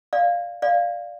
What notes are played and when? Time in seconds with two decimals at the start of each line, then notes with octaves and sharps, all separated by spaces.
0.13 D5 F5
0.62 D5 F5